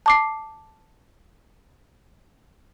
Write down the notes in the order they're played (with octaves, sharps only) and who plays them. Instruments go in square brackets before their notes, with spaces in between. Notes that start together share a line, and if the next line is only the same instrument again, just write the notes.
[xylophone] A5 D6 C7